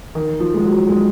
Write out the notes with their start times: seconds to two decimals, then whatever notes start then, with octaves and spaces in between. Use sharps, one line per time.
0.15 D#3
0.40 F3
0.54 G#3
0.64 F#3
0.88 G#3